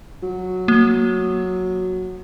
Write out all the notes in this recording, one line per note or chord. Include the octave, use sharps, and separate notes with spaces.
F#3
A#3